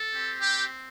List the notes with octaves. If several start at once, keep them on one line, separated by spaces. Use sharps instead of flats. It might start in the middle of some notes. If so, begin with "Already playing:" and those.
Already playing: A4
C4 G4
G4